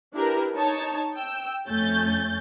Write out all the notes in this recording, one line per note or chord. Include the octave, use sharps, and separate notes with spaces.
D4 E4 G4 A#4 B4
D#4 C#5 A5
G5 E6
F2 A3 C#4 G6 A6